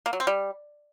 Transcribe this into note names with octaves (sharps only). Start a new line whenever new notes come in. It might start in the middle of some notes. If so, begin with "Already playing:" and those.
A#3
F#3
C4
G3